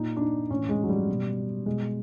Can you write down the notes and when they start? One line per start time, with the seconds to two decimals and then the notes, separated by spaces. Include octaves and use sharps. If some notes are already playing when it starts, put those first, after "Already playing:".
Already playing: A#2 D#4
0.17 D4
0.21 D#4
0.50 A2 E3 C#4
0.69 G#3
0.83 F#3
0.89 G3
1.09 B2
1.66 B2 G#3